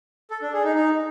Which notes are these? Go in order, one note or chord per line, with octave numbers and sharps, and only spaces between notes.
A4
D4
G#4
D#4
D#4